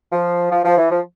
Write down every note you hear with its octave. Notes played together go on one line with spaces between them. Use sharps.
F3
F3
F3
E3
F3